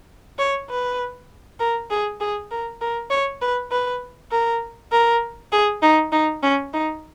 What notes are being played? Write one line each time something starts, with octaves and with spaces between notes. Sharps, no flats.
C#5
B4
A#4
G#4
G#4
A#4
A#4
C#5
B4
B4
A#4
A#4
G#4
D#4
D#4
C#4
D#4